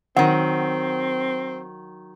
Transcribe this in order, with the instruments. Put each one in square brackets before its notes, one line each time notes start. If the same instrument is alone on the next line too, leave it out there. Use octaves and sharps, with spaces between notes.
[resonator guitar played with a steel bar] D#3 F#3 [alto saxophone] C4 [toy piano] F#5